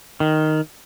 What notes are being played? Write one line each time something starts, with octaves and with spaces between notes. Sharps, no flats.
D#3